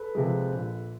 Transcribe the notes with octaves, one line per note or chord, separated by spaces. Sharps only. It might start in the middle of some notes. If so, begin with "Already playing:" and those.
Already playing: A4 B4
C3 F3 G#3
A#1